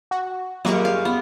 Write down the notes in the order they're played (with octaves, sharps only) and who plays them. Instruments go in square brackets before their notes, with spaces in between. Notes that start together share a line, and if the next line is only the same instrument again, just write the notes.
[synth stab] F#4
[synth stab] F#2 A#3 C#6 [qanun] G3 G#3 G4
[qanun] F5
B3